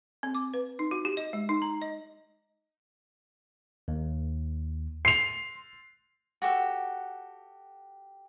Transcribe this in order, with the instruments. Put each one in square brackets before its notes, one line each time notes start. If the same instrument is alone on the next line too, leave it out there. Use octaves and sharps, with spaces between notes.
[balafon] C4
D6
B4
D#4
F#4
G4
D#5
G#3
D#4
A#5
D#5
[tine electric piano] D#2
[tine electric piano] C6 [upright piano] C7 F7
[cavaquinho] F#4 G4 A4